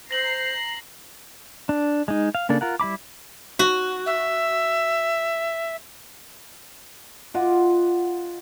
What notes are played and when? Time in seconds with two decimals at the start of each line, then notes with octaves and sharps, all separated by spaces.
0.11 C5 A#5 A#6 C7 F#7
1.69 D4
2.08 G#3 D#4
2.35 F5
2.49 C#3 A#3 D4 A4
2.61 F4 A#4 F#5
2.80 G3 E4 B5 D6
3.59 F#4
4.06 E5
7.34 F4 D#5 F#5 D6